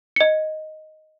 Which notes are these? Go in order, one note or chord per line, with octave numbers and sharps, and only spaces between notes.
D#5 C#7